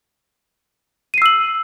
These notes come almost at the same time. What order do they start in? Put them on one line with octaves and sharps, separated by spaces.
D#7 C7 E6 F#7